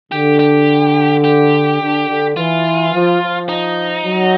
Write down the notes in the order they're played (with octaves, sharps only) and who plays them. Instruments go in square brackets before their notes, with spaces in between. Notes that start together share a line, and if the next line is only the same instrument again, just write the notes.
[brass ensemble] D3 [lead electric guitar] G4
[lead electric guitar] G4
G4
[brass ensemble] D3
D3
[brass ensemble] E3 [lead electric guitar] F4
[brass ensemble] F3
F3
[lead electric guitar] D#4
[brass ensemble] F#3